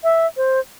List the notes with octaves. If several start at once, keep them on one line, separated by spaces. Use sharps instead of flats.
E5
C5